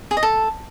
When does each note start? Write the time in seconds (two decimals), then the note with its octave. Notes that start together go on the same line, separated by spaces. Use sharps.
0.11 G#4
0.17 D#5
0.23 A4